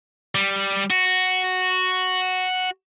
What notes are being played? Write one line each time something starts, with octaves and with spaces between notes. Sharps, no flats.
G3
F#4